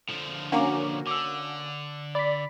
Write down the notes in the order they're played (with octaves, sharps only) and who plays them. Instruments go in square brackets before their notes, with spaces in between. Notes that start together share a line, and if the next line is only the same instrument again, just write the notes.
[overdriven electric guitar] D3 F3
[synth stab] A#3 C#4 F#4 [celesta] D4 A#5 D6
[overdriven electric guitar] D3 [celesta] D6 E6
[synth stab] D5 [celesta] B5 B6